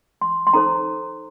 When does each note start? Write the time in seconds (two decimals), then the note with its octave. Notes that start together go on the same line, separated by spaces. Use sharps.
0.22 C6
0.47 C6
0.53 D#4 A4 C5 A#5